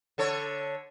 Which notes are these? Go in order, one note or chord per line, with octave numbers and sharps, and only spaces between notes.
D3 A4 C#5